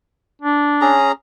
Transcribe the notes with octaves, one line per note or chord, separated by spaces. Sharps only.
D4
C#4 G#4 A#5